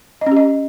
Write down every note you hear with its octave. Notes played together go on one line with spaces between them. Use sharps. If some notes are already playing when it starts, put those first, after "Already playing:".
D#5
C#4
G4
D#5